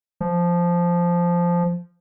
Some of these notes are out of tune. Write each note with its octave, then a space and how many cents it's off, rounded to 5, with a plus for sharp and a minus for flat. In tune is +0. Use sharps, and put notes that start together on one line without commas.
F3 -5